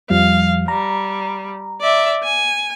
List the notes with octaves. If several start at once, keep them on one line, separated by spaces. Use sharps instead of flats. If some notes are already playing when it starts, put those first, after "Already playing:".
F2 F3 G3 F5
G3 A#5
D5 E5
G#5